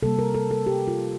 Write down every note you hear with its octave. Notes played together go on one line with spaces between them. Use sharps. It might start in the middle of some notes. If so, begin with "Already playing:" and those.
C3 G3 A#3 A4
A#4
A4
A4
G4
F4